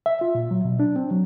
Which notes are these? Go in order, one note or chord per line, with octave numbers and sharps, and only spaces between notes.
E5
F4
A#2
F#3
B2
D4
C4
F#3